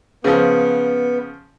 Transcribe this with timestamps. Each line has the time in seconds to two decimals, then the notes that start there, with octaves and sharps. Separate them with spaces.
0.24 C#3 F3 B3